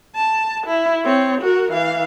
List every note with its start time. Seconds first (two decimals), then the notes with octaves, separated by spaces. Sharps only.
0.15 A5
0.67 E4
1.04 C4 C#5
1.41 F#4 A#4
1.72 E3 F5